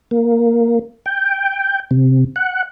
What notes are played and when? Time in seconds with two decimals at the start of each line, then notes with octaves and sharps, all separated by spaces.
0.11 A#3
1.06 G5
1.91 C3
2.36 F#5